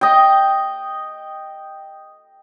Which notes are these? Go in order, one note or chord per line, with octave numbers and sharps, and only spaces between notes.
D#5 G5